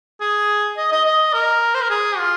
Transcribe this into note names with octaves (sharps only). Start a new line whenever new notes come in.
G#4
D#5
D#5
D#5
A#4
C5
A#4
G#4
F4